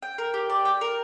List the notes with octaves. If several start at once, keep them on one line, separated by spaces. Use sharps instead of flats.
G5
A#4
G4
D5
G5
A#4